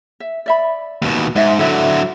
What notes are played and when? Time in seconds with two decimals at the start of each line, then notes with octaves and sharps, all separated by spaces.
0.20 E5
0.46 D5 E5 B5
1.02 D#2 B2
1.36 G#2 D#5 E5
1.59 D3 F#3 E4 A4 E5